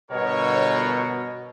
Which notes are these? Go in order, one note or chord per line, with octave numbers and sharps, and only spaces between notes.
G1 B2 A#4 C#5